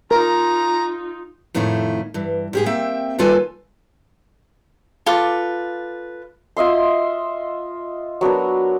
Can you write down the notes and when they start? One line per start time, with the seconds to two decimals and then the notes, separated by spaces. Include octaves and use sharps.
0.11 D#4 F4 A#4 A#5
1.54 F2 A2 D#3 A3 E4
2.14 G2 E3
2.53 G#2 G4 G#4
2.66 A#3 C4 E5 G5
3.19 D#2 G3 F4 A4 B4 G#5
5.06 F4 A4 B4 D6
6.57 F4 D#5 E5 C6
8.21 F#3 B3 D4 A#4